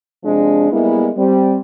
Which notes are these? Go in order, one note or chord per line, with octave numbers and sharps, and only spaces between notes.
C3 F3 G#3 D4
G3 G#3 A#3 B3 E4
G3 C4